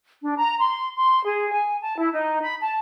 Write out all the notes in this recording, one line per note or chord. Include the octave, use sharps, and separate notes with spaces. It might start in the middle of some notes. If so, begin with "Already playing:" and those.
D4
A#5
C6
C6
G#4
G#5
A5
E4
D#4
B5
A5